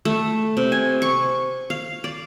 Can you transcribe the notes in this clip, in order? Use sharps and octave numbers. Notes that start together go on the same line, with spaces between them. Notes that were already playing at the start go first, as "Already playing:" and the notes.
A3
C3
G#5
C#6
F5
D5